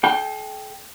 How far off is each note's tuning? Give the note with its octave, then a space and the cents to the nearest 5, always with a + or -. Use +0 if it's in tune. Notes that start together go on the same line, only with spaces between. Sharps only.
A4 -45 G5 +0